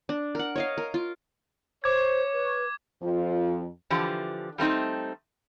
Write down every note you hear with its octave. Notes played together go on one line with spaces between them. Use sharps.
D4
A#4 F#5
C#5 D#5 F5
A#4
F4
C5 C#5 D6 G#6
B4
F2 F3 F4
D3 E3 F3 G4
G3 A3 C4 D#4